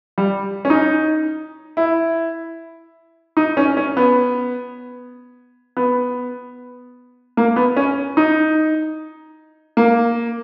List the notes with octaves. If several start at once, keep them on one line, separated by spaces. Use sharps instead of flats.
G3
C#4
D#4
E4
D#4
C#4
C#4
B3
B3
A#3
B3
C#4
D#4
A#3